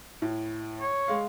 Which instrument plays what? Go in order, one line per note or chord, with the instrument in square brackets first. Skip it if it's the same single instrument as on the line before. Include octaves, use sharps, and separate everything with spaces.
[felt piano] A2
[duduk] C#5
[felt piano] G#3 F5